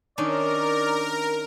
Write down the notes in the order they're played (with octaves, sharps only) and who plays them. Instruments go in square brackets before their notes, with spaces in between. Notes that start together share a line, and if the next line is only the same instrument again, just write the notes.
[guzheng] D#3 C#4 D4 [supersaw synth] A#4 [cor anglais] D5